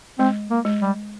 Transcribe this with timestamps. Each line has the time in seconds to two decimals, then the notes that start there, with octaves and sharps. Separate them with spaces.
0.19 G#3 C4
0.50 A#3
0.65 G#3
0.82 G3